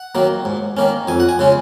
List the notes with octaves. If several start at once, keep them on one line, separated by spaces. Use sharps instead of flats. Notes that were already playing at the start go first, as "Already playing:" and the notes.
Already playing: F#5
D#3 F#3 A#3
G#2
D#3 A#3 C#4
F2 G#5
F#5
G#5
C#3 G#3 C#4